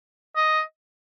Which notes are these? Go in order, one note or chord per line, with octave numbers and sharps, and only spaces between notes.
D#5